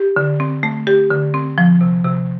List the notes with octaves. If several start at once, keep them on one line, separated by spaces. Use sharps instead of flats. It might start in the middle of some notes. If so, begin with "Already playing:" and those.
Already playing: G4
D3
C4
A3
G4
D3
C4
F3
C3
C3